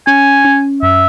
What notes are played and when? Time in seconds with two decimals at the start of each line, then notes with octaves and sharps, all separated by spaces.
0.07 C#4 G#5
0.45 C#4
0.83 F#2 E5